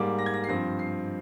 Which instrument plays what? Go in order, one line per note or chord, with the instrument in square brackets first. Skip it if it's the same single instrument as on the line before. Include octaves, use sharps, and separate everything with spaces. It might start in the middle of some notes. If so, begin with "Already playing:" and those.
Already playing: [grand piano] G#2 G3 A#3 D6
A#6
G#6
A#6
C7
G2 F3 C4 A#6
C7